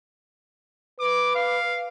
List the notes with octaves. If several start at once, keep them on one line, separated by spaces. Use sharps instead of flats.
B4 D6
F5